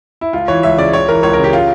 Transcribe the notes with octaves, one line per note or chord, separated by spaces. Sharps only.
E4
C#2 F4
E3 C#5
C#2 E5
C#3 D5
C#2 C#5
E3 A#4
C#2 C#5
A#4
C#3
G4
F4